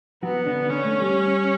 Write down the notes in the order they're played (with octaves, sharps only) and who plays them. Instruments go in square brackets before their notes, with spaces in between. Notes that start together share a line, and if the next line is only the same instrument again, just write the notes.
[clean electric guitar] F#3 F#4 [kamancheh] B3
[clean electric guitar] D3 D4
[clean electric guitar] D3 D4 [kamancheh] C#4
[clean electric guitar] A3
G3